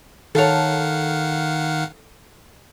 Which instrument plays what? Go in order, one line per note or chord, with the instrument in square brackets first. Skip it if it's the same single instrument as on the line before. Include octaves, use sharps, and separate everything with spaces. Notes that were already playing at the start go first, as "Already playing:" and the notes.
[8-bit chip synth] D#3 F5 F#5 [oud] A4 C#5